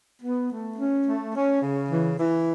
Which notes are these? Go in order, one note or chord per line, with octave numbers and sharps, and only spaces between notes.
B3
A3
C#4
A3
C#4
C#3
E3
E3